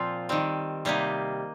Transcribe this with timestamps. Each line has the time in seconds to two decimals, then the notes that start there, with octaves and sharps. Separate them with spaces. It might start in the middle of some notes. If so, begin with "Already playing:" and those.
Already playing: A#2 F3 C4 F4
0.29 D#3 G3 C4
0.85 C3 G3 A#3 D#4